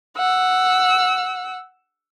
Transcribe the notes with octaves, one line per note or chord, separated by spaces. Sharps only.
F#5 E6